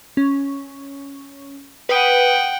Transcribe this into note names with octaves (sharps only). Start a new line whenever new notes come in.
C#4
B4 F#5 G5 D#6 D#7